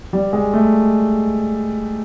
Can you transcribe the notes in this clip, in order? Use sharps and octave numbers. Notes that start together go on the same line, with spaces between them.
G3
G#3
A3